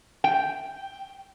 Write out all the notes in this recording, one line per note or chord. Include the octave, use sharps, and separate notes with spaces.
G5